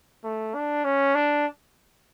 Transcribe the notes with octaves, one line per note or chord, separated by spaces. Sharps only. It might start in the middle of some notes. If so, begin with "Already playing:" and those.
A3
D4
C#4
D4